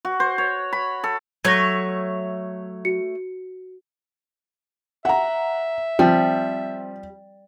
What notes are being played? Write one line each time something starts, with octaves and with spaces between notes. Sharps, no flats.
F#4
C5
C#5
B5
A4
F#3 A3 C#5 G#6 A#6
F#4 C#7
E5 F#5 A#5
F3 G3 C4